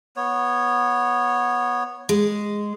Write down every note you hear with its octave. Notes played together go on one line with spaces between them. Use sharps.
B3 C#5
G#3